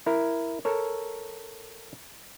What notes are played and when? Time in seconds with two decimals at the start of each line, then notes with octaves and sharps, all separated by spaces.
0.06 E4 A#4
0.65 A4 A#4 C#5